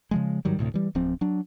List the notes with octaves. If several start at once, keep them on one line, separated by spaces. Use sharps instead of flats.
C#3 F3 G#3
G#2 D#3 F#3 G3
D2 A2 C3
E3 G3
D1 F3 C4
F#3 D4